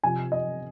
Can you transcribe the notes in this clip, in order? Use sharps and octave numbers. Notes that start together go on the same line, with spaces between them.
C3 F3 G#5
D#5